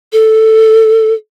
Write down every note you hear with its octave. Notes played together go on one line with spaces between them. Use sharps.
A4